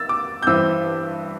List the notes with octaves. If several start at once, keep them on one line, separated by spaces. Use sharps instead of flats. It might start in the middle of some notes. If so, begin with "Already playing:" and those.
Already playing: E6 A6
D6
G6
G2 E3 C4 E6